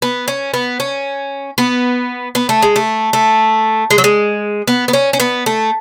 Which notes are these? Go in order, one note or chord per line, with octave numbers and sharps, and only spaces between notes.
B3
C#4
B3
C#4
B3
B3
A3
G#3
A3
A3
G#3
F#3
G#3
B3
B3
C#4
C#4
B3
A3